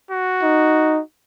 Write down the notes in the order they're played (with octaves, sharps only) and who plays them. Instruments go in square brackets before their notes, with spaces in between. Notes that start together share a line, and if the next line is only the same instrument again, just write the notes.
[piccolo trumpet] F#4
[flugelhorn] D#4